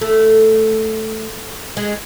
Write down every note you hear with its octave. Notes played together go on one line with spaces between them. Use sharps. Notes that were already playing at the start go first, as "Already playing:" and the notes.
A3
G#3